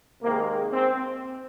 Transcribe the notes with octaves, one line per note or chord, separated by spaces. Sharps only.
C3 D#3 G#3 A#3
C4